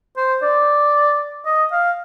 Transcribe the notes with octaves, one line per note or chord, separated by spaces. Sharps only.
C5
D5
D#5
F5